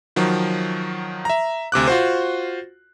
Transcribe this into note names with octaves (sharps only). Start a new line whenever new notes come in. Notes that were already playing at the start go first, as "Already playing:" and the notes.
D#3 F3 F#3
E5 A#5
D2 C3 D6 F#6
F4 F#4 C5